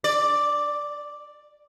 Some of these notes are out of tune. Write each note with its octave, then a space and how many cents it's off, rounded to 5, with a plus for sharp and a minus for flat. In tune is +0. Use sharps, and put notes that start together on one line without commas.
D5 +0